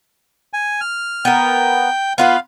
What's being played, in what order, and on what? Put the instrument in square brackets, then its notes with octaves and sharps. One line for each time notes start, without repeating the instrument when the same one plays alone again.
[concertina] G#5
F6
[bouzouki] B3 A#4 [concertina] G5
[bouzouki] B3 F4 B4 [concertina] F5